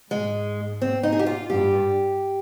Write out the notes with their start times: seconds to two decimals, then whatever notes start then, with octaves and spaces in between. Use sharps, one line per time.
0.11 G#2 G#3
0.81 C4
1.03 D#4
1.12 G#4
1.19 G4
1.26 F4
1.50 G2 G4